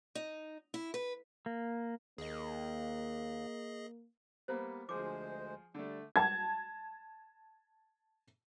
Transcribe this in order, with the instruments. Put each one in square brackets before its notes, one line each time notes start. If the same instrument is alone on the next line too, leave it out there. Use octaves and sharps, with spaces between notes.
[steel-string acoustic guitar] D#4
E4
B4
[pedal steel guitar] A#3
[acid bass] D#2 [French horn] A#3 [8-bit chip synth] G#4 D#5
[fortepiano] G3 A#3 B3 [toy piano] C5
[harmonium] D2 G#3 C5 [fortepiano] F3 G#4 [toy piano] D6
[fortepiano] D3 A3 [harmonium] G3
[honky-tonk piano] A5 G#6